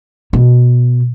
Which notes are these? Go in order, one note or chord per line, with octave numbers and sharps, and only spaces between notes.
B2